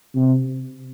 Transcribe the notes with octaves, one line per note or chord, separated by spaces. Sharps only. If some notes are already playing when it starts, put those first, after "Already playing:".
C3